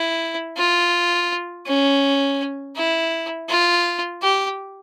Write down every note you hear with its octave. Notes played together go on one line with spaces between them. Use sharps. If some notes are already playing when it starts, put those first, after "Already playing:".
Already playing: E4
F4
C#4
E4
F4
G4